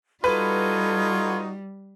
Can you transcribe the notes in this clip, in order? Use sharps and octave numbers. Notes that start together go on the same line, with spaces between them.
G3 D#4 F4 F#4 A4 B4 G#6